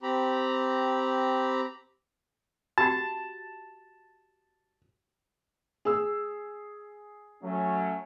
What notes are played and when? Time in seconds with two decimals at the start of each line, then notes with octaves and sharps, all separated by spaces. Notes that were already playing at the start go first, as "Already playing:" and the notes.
0.03 C4 G4 A#5 B5
2.78 F#4 G4 F#5 A5
5.85 G#4 E6
7.43 F#3 A3 C#4